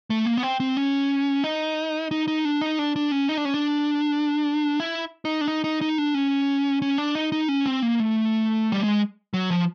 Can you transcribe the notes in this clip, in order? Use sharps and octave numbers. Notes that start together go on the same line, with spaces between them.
A3
A#3
B3
C4
C4
C#4
D#4
D#4
D#4
D4
D#4
D4
D4
C#4
D#4
D4
C#4
D4
E4
D#4
D4
D#4
D#4
D#4
D4
C#4
C#4
D4
D#4
D#4
C#4
C4
A#3
A3
G3
G#3
F#3
F3